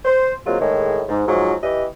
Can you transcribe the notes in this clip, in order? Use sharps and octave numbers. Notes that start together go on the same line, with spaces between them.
C5
D#3 F#3 G#3 A#3 C4 F4
A2 D#3 G#3
G#2
G#2 F3 F#3
E3 G4 D#5